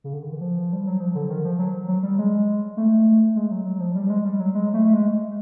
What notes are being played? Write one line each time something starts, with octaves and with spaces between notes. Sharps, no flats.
C#3
D3
D#3
E3
F3
G3
F#3
F3
D3
D#3
F3
F#3
F#3
G3
G#3
A3
G#3
F#3
F#3
F#3
F3
G3
G3
G#3
G3
F#3
G#3
A3
A3
G#3